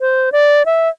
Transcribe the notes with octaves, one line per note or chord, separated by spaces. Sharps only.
C5
D5
E5